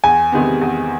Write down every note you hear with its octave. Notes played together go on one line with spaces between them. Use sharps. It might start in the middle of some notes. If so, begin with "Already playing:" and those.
E2 G#5
C3 D#3 G#3 B3
E2